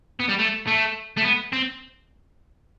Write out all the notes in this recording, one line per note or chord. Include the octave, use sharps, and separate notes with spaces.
B3
G3
A3
A3
A3
B3
C4